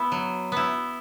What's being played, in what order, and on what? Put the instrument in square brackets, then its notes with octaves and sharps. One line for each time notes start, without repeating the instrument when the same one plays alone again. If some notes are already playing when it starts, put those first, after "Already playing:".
Already playing: [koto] B3 E4
F#3
B3 E4